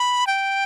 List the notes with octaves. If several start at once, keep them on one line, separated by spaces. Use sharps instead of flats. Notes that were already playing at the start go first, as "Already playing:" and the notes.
Already playing: B5
G5